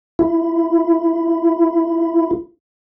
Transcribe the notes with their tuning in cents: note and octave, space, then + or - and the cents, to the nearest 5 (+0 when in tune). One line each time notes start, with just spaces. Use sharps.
E4 +15